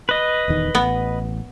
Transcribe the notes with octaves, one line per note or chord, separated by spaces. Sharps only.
B4 D#5
D#1 E2 D#3
A1 B3